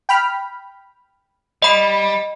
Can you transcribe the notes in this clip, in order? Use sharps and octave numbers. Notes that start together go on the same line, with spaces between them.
G5 B5 F6
G3 D#5 B5 C7